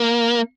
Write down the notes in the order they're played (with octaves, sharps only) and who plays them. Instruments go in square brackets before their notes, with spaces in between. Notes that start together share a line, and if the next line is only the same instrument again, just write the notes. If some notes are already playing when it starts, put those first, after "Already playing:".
Already playing: [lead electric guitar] A#3